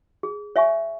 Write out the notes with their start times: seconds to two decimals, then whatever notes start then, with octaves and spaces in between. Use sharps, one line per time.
0.23 G#4
0.56 C#5 E5 G#5 C#6